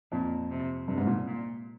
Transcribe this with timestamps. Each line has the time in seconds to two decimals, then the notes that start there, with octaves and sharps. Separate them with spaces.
0.12 F2 A#2
0.50 C3
0.87 G2 C3
0.98 G#2
1.07 A#2
1.26 A#2